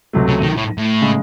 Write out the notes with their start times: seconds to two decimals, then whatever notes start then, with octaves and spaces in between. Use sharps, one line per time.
0.13 C#2 C3 F#3 A3
0.28 C#3
0.42 D#3
0.57 A2
0.78 A2
1.01 C#3 G#3